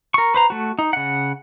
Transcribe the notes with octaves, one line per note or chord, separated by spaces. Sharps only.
A#4 C#6
B4 C5 A#5
A3 F#4
D#4
C#3 F#5